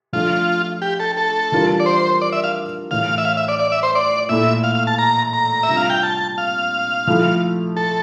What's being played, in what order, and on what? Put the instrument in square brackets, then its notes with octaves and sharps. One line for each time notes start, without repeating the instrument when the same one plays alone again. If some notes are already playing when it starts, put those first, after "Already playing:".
[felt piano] F3 A3 D4 [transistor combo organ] F4
[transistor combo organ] G4
A4
A4
[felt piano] E3 G3 D4 F4 A#4
[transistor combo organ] D5
C5
D5
E5
F5
[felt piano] A2 E3 A3 [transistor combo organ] F5
[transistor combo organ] E5
F5
E5
D5
D5
E5
C5
D5
[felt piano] A#2 A3 E4 [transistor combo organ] E5
[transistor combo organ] F5
F5
A5
A#5
A#5
E5
[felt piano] C3 G3 D4 F4
[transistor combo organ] F5
G5
A5
F5
[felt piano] F3 A3 E4
[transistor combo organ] A4